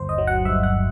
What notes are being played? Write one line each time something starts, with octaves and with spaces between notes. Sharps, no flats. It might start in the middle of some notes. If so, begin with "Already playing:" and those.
Already playing: G1 D#2 D#3 C5
D#5
F#3
F#5
G2 E5
F#5